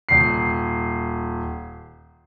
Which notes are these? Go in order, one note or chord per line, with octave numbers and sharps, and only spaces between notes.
D#1 C7